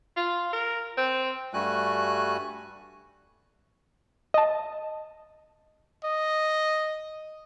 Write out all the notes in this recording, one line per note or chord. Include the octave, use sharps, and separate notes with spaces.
F4
A#4
C4
G2 G3 A3 F#4 G#5 F#6
D#5 A5
D#5